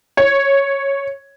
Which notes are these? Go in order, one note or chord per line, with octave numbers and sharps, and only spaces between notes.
C#5